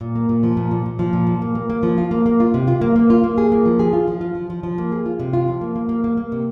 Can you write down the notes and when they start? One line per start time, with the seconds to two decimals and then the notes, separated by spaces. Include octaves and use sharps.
0.01 A#2
0.15 A#3
0.29 A#2
0.43 F3
0.57 A#2
0.71 A#2
0.86 A#2
0.99 F3
1.13 A#2
1.27 A#2
1.42 A#3
1.55 A#3
1.70 A#3
1.83 F3
1.98 F4
2.11 A#3
2.26 A#3
2.40 F4
2.54 C3
2.68 F4
2.81 A#3
2.96 A#3
3.10 F4
3.24 A#3
3.38 G#4
3.52 A#3
3.66 F3
3.79 G#4
3.93 F4
4.08 F3
4.21 F4
4.35 F3
4.50 F3
4.63 F3
4.78 A#3
4.92 G#4
5.06 F4
5.19 C3
5.33 F4
5.48 F3
5.61 A#3
5.76 A#3
5.89 A#3
6.04 A#3
6.17 A#3
6.32 C3